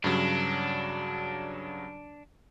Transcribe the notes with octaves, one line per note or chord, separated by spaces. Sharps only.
G2 C#3 F#3 D4